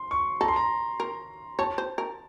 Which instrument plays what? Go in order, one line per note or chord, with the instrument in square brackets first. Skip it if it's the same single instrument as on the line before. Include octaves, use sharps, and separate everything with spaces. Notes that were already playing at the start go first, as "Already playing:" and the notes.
Already playing: [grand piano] C6
C#6
[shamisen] A4 [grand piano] A#5
[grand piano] C6
A#5
[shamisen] A#4
[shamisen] C#5 [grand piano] A5
[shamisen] C5
A#4